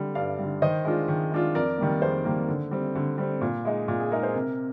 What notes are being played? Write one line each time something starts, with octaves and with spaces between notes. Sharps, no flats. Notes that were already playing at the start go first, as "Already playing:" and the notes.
Already playing: D3 G3
G2 D5 F5
D3 G3
D#3 C5 D#5
G#3 D4 F4
D#3
G#3 D4 F4
F2 A#4 D5
D#3 G3 A#3
F2 G#4 C5
D#3 G3 A#3
D3
G3 C4
D3
G3 C4
A#2
G#3 D#4
A#2
G#4
G#3 D#4 A#4
G#4 C5
C3 A#4